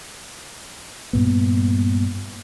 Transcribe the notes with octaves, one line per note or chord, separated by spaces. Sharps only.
G2 A#2 B3